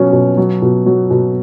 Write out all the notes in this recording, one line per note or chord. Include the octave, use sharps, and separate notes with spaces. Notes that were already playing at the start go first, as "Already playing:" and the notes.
Already playing: B2 F#3 C#4
B2
F#3
B2
F#3
B2